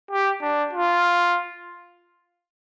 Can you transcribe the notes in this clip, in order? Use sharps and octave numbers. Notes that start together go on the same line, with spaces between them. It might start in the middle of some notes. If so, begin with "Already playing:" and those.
G4
D4
F4